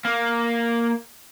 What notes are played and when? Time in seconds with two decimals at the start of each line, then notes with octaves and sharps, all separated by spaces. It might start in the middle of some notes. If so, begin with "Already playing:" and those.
0.05 A#3